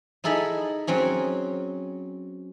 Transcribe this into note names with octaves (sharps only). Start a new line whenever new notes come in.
D#4 E4 G#4 A4 D#5 B5
F#3 C4 C#4 G#4